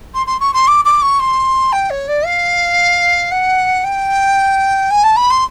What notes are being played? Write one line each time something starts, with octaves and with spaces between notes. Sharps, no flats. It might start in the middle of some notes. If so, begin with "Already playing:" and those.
C6
C6
C#6
C6
D6
D6
C#6
C6
G5
C#5
D5
F5
F#5
G5
G#5
A5
B5
C6